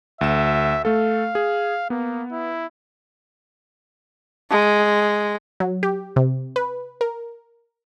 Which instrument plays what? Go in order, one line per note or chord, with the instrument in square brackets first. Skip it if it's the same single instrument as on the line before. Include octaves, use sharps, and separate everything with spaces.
[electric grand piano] D2 E7 [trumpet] E5
[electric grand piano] A3 A4 [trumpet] F5
[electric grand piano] G#4
[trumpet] A#3 [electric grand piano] B3
[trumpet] E4
[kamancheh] G#3
[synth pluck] F#3
G4
C3
B4
A#4